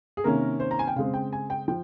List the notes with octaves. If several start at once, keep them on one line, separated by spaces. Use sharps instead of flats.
G#4
C3 D#3 A#3 C#4 A#4
C5
A#5
G#5
G5
C#3 G#3 C4 F5
G5
G#5
G5
F3 G5